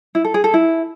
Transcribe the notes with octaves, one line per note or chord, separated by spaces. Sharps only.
E4
A4
G#4
A4
E4